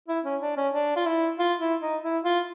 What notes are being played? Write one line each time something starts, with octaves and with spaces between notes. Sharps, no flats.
E4
C#4
D4
C#4
D4
F4
E4
F4
E4
D#4
E4
F4